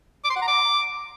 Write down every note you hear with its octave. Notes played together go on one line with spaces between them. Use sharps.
D6
C6
F#5
A#5
D6